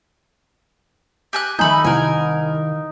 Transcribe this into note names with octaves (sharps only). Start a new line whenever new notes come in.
G4 G#5 F#6
D#3 A3 D#4 G#5 B5 G6
C2 A#4 G#5